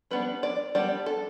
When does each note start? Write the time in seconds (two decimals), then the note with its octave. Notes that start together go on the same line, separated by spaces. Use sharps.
0.11 G3 B3 D4 B4
0.43 D5
0.75 G3 B3 D4 D5
1.06 A4